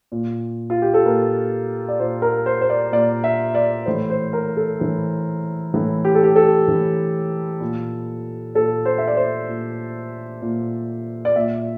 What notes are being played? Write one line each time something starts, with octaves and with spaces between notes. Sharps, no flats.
A#2
F4
G4
A4
A#2 A#4
D5
A#2 C5
A#4
C5
C5
D5
A#2 D5
E5
D5
A2 E3 C5
C5
A#4
A4
A2 E3
A2 E3
G4
A4
G4
A4
A2 E3
A#2
A#2 A4
C5
E5
D5
C5
A#2
A#2
D5
A#2 E5